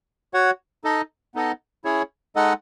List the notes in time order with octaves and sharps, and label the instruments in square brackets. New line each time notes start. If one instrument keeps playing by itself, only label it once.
[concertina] F#4 C#5 F#5
D#4 A4 D#5
B3 D#4 A4 D#5
C#4 E4 G#4 C#5
G#3 D#4 A4 D#5 F#5